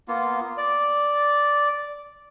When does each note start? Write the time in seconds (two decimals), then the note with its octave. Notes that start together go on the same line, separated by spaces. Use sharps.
0.08 A#3 B3 F4
0.57 D5